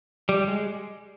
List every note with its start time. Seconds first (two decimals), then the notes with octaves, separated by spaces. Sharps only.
0.29 G3
0.48 G#3